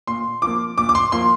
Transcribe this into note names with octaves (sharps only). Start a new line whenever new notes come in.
A#2 C6
F3 A#3 D6
A#2 D6
D6
C6
F3 A#3 C6